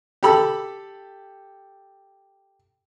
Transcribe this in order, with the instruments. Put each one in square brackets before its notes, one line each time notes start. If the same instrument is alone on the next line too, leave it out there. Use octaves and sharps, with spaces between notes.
[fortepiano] G4 A4 B5 E6